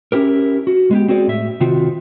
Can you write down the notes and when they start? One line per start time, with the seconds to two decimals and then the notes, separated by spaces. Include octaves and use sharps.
0.12 C#4 E4 G4 A#4
0.67 F#4
0.91 G#3 B3 G4
1.08 C4 F#4 G#4 B4 D5
1.27 A2 E5
1.60 C3 D#3 C4 F4 F#4